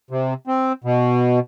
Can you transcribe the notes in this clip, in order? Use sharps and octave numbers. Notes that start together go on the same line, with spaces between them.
C3
C4
B2